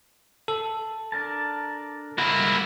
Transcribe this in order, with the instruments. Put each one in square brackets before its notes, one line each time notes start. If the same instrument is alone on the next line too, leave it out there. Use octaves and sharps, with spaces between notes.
[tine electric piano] A4
[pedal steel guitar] D4 A#4 A5
[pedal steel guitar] G3 G#3 F#4 [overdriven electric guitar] A#3 E4